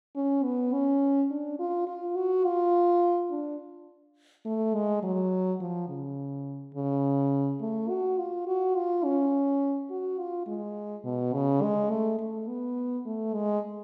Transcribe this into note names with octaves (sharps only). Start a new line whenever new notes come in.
C#4
B3
C#4
D4
F4
F4
F#4
F4
D4
A3
G#3
F#3
F3
C#3
C#3
A3
F#4
F4
F#4
F4
C#4
F#4
F4
G#3
B2
C#3
G#3
A3
A3
B3
A3
G#3